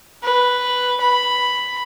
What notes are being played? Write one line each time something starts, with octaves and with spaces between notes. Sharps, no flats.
B4
B5